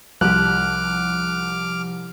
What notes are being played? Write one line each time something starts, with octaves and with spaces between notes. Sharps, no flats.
C2 F3 G4 D6 F6 F#6